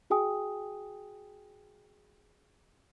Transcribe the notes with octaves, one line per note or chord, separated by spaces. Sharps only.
F#4 G#4 G5 G#5 D#6